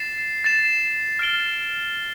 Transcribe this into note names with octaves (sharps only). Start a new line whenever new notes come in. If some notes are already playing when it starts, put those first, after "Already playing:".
Already playing: A6 C7 E7
A6 C7 E7
F6 A6 D7 G7